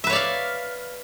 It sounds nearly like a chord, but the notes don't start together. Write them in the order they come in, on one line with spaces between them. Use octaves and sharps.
E5 B4 C#5 D5 F5